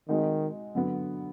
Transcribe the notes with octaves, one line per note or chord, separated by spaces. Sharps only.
D#3 G#3 C4 D#4 F#4
D3 F#3 B3